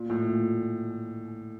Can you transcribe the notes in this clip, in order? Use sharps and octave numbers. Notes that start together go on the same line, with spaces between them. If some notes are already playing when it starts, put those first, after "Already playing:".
Already playing: A#2
A2
A#2